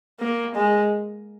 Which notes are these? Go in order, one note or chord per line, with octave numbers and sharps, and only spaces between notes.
A#3
G#3